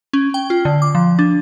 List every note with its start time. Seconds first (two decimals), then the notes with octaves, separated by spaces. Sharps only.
0.13 C#4
0.34 G5
0.50 F4
0.65 D3
0.82 D6
0.95 F3
1.19 D4